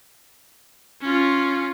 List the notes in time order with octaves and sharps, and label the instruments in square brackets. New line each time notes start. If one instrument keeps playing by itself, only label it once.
[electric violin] C#4 F4